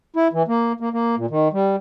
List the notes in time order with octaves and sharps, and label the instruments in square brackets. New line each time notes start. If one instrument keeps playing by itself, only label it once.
[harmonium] E4
E3
A#3
A#3
A#3
A#2
D#3
G3